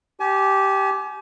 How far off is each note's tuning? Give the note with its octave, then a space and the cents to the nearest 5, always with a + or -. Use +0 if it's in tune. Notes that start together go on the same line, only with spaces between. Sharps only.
G4 -10 G#5 +35